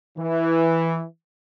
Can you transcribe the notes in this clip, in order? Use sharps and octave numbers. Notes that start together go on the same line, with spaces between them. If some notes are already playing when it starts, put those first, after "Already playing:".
E3